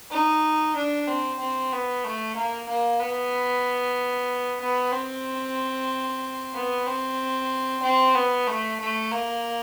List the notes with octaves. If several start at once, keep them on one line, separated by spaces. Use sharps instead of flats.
D#4
D4
C4
C4
B3
A3
A#3
A#3
B3
B3
C4
B3
C4
C4
B3
A3
A3
A#3